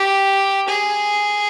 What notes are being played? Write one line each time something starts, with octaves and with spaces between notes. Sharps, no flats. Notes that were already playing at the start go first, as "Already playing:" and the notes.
Already playing: G4
G#4